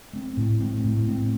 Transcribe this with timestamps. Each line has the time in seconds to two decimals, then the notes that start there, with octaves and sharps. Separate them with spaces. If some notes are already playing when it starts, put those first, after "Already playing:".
0.13 A3 C4
0.37 A2
0.61 A3 C4
0.84 A2
1.07 A3 C4